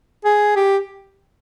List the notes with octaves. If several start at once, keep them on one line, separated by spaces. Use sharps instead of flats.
G#4
G4